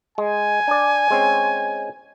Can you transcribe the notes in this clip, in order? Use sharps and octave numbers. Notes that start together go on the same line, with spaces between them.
G#3 G#5
D4 D5
G#3 C4 C#4